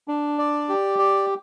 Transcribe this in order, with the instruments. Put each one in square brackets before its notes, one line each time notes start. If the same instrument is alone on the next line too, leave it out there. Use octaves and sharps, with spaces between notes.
[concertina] D4
D5
G4
D5